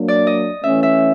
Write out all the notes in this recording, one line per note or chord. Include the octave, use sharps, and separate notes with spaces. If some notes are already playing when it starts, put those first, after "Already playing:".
Already playing: F#3 A#3 D4
D5
D#5
E3 A3 C#4 E5
E5